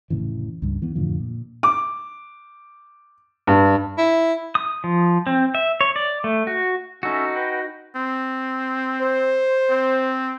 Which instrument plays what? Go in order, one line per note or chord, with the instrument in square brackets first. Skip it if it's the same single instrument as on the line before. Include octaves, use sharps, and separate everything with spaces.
[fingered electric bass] F1 A2 C#3 E3
C#2 G2
E3 B3
F2 A2 D3 F3
A#2
[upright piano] D6
G2
[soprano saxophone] E4
[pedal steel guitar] D#6
F3
C4
E5
C#5
D5
A3
F#4
[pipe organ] C#4 A4 E5 [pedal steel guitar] D#4 F#4
[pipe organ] B4 F#5 G5
[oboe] C4
[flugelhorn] C5
[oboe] C4